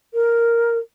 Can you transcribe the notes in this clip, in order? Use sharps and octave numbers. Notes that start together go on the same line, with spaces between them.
A#4